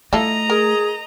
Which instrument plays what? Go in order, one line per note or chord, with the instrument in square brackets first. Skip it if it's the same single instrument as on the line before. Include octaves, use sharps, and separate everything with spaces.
[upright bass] A3 [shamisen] E4 F4 A4 [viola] D#5 A#5
[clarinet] G#4 [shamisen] A#4